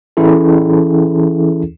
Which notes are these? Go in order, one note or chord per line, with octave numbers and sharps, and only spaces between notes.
E3 C#4 E4 G#4 A4